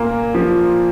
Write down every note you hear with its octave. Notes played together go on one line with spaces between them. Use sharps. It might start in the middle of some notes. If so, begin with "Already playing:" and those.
Already playing: A#2 A#3
F3